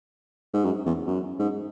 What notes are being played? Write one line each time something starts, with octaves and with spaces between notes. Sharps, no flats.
G#2
F#2
E2
F#2
G#2